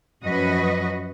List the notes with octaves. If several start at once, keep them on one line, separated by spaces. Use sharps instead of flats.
F#2 F3 F#4 B4 D#5